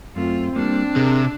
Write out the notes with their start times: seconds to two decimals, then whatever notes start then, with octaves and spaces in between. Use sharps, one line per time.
0.16 F#2 A3 C4 F4
0.56 G3 A#3 D4
0.96 C3 G#4 A#4